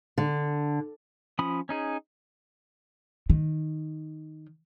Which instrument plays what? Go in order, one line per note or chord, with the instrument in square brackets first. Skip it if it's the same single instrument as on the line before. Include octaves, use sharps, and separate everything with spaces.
[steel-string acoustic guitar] D3
[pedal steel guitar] F3 C#4 B5 D#6
C#4 D#4 G#4
[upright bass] D#3